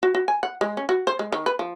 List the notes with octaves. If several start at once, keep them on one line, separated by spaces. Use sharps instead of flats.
F#4
F#4
G#5
F#5
G#3
C#4
F#4
C5
G#3
D#3
B4
F3